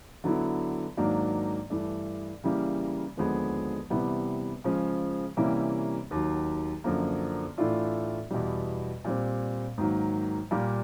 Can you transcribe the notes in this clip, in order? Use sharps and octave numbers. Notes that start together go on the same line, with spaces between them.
D3 F#3 B3 E4
G#2 D#3 F#3 A#3 D4
G2 E3 A3 D4
C#3 E3 G3 A#3
D#2 D3 F3 G#3 B3
C3 E3 G3 B3
C#3 F3 G#3
C3 E3 G3 A#3 C#4
D#2 D#3 F#3
F#2 D3 F3 A#3
A2 E3 A3 D4 F4
E2 B2 G3
A#2 G3 C4
G#2 D#3 F#3 A#3
A#2 G3 A#3